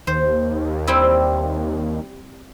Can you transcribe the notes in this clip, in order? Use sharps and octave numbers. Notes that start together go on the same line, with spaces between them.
D#2 C5
G3 C4 E4